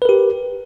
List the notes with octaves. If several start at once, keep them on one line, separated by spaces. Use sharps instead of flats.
G4 A#4 B4